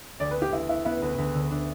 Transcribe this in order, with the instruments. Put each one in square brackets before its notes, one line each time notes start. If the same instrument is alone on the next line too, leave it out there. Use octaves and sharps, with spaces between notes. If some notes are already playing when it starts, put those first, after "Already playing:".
[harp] D2 [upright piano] D5
[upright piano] B4
[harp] B3
[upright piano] G4
[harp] D2 [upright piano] E4
[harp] B3 [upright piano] E4
[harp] B3 [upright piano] E4
[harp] D2 [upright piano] B4
[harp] D2
D3
D4